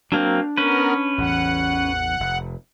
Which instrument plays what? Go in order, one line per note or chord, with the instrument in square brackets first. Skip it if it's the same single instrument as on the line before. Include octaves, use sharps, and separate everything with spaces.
[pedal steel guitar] F#3 A#3 C4 [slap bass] D4
[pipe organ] B3 A#4 [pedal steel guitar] C#4 B4
[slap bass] A1 E2 [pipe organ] F#5
[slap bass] F1